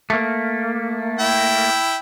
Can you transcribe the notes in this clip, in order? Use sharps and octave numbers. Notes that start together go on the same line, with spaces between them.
A3 A#3
E4 G5